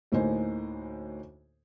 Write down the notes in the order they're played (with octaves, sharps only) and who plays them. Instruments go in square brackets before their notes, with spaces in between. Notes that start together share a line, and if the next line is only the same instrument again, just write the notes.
[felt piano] D2 A2 A#3 D#4 C5 G#5